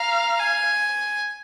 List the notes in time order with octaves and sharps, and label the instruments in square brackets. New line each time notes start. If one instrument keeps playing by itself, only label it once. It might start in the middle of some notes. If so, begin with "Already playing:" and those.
Already playing: [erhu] F5 [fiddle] A#5
[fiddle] G#5